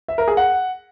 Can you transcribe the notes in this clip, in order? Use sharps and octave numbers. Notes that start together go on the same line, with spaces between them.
E5
A#4
G#4
F#5